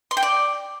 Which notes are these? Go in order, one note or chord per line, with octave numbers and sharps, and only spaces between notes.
C6
G5
D5